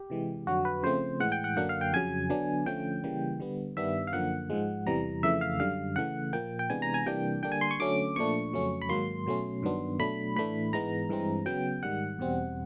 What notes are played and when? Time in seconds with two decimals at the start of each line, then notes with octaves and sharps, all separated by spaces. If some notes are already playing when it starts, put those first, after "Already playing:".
Already playing: G4
0.10 C3 E3 G#3
0.47 F2 D3 F#3 F#4
0.65 B4
0.83 C#3 F3 A3 C4 C5
1.20 A2 E3 G#3 F#5
1.32 G5
1.44 F#5
1.56 F#2 D3 F#3 A#3 D4 F#5
1.69 F5
1.81 G5
1.93 F2 C#3 F#3 G#5
2.30 D3 F#3 B3 D4
2.66 D3 F3 A3 C#4 G5
3.04 C#3 E3 G3 A#3
3.40 D3 G3 B3
3.77 G2 D#3 G3 B3 D4 E5
4.07 F5
4.13 F#2 D3 F3 A#3 F#5
4.50 G#2 F3 G#3
4.86 E2 C3 E3 G3 A#5
5.23 F2 C#3 E3 A3 E5
5.41 F5
5.60 F#2 D3 G3 F5
5.96 C#3 E3 A3 F#5
6.33 A#2 F3 A#3 G5
6.59 G5
6.70 C3 E3 G#3 B3 D4 G#5
6.82 A#5
6.94 G#5
7.06 C3 E3 G3 A#3 D4 G5
7.43 D3 G3 A#3 D4 G5
7.52 G#5
7.61 C6
7.71 C#6
7.80 D3 F#3 A3 C#4 D6
8.16 A#2 F3 A3 D4 C#6
8.53 F2 C#3 F#3 A3 C#4
8.82 B5
8.89 G#2 D#3 F#3 A#3 C6
9.26 B2 F#3 A3 C#4
9.62 G2 D#3 F#3 B3 D4
9.99 B2 F#3 A3 D4 B5
10.36 A2 E3 A3 D4 B5
10.73 G#2 E3 G#3 B3 A#5
11.09 G2 E3 G#3 C4
11.46 C#3 F#3 B3 G5
11.83 G#2 D#3 G3 F#5
12.19 E2 B2 G3 C4